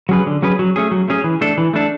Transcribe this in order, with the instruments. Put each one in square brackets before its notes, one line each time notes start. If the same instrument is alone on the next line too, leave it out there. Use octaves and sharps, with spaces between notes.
[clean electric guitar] F#3 C#4 G#4 B4
D3
F#3 C#4 G#4 B4
F#3
A3 C#4 G#4
F#3
A3 C#4 G#4
E3
A3 D4 A4
E3
A3 D4 A4